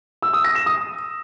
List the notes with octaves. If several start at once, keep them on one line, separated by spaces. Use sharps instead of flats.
E6
D#6
A#6
E7
D#6